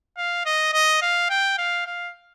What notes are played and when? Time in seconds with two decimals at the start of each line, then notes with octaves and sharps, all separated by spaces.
0.17 F5
0.45 D#5
0.73 D#5
1.02 F5
1.30 G5
1.58 F5
1.86 F5